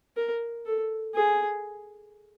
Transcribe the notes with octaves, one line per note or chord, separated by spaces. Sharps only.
A#4
A4
G#4